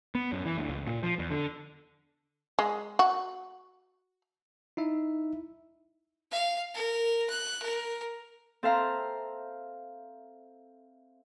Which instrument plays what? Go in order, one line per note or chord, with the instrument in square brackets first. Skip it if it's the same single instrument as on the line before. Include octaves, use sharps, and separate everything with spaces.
[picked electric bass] B3
F#2
E3
D2
C#2
A#2
F3
E2
D3
[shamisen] G#3
F#4
[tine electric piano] D#4 E4 E5
[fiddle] F5
A#4
F#6
A#4
[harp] C4 A4 E5 F5 A#5